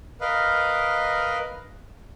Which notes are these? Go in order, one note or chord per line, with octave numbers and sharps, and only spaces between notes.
A#4 B4 D#5 F5